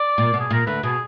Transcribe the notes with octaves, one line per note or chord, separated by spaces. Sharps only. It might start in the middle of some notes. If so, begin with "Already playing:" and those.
Already playing: D5
A#2
B2
G#4
A#2 A#4
D2 D3 B4
B2 G#4